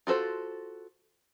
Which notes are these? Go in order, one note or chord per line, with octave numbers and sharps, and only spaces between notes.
F4 F#4 A4 C5